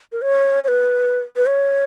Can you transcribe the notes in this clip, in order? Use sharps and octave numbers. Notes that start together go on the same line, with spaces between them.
A#4
C#5
C#5
B4
B4
C#5